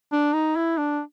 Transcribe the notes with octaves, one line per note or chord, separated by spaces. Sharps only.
D4
D#4
E4
D4